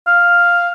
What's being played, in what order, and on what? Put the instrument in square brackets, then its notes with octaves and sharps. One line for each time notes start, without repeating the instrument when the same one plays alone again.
[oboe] F5